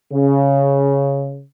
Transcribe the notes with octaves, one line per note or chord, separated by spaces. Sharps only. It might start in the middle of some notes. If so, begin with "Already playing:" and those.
C#3